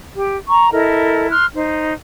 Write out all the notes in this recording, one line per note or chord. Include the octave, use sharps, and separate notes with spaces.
G4
A#5 C#6
E4 A4 A#4 D#5
C6 F6 F#6
D#4 C5